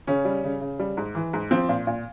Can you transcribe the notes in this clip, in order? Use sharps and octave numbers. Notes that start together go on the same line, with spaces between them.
C#3 C#4
G3
C#3
C#3
G3
G#2
E3
G#2
F3 C4
A#2
A#2